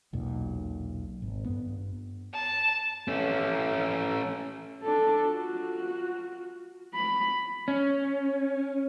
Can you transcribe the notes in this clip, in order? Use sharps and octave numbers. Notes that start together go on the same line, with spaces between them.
E1 B1 A#2
G#1
G2 B3
A5
A3 C#4
D4 A4
F4 F#4
B5
C#4